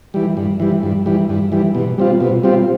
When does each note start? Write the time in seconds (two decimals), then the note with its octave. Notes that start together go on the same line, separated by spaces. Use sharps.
0.14 E3 G3
0.37 G2
0.60 E3 G3
0.83 G2
1.06 E3 G3
1.29 G2
1.52 E3 G3
1.75 B2
1.98 G3 C4 F4
2.20 B2
2.43 G3 C4 F4